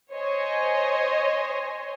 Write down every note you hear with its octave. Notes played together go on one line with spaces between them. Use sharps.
C5 C#5 D#5 G#5